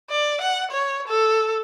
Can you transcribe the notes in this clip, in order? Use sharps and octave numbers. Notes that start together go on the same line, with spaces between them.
D5
F#5
C#5
A4